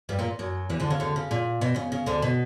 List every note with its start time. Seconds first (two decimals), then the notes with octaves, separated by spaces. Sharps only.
0.09 G2 G3
0.19 A#2 A#3
0.39 F#2 F#3
0.69 E2 E3
0.80 D2 D3
0.90 C#3
1.00 D2 D3
1.16 C#3
1.31 A#2
1.61 B2
1.76 C#3
1.92 C#3
2.06 D2 D3
2.22 B2